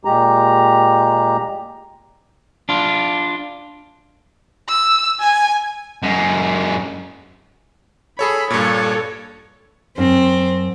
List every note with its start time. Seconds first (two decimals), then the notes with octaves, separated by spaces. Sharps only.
0.05 A#2 G#3 G4 A#5
2.69 D4 F4
4.68 E6
5.20 G#5
6.03 F#2 G#3
8.19 G#4 A4 C#5 B5
8.50 G2 A#2 A4 C#5
9.98 F#2 C4